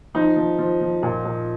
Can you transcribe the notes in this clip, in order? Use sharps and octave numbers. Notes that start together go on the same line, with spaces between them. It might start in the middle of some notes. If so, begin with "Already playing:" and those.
F3 D#4
F3
F3
F3
A#2
A#2